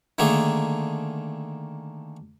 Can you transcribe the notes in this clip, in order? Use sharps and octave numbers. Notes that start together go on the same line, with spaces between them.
D3 D#3 A3 A#3 G#4